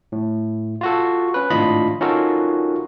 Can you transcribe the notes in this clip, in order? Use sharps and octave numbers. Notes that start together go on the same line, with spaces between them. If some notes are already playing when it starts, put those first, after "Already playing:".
A2
F4 F#4 A4
C#4 B4
G#1 A2 D4 F4 D#5 B5
C#4 D#4 F4 F#4 A4 A#4